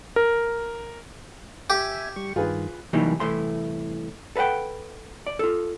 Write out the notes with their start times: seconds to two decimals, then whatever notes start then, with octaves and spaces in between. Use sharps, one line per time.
0.16 A#4
1.70 G4 E5 G#5
2.16 G3 C#6
2.36 G2 D#3 F4 G#4 B4
2.93 C3 E3 F#3 G3 A#3 D#4
3.20 C2 A2 E3 A3 C6
4.36 A4 B4 D5 F#5 G5
5.27 D5
5.39 F4 A4